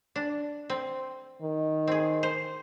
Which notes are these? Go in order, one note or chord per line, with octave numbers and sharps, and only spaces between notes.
D4
C4
D#3
C4 G#4
C5